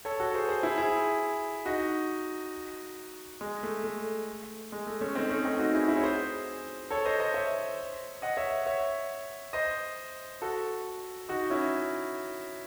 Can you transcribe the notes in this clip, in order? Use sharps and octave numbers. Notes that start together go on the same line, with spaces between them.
A4 C#5
F#4 A4
G#4 C5
G#4 C5
E4 G#4
E4 G#4
D#4 F#4
G#3
A3
A3
G#3
A3
A3 C#4
C4 D#4
A3 C#4
C4 D#4
D#4 F#4
E4 G#4
E4 G#4
C#5
G#4 C5
A4 C#5
C5 D#5
C5 D#5
C#5 E5
D#5 F#5
C#5 E5
C#5 E5
C5 D#5
F#4 A4
D#4 F#4
C#4 E4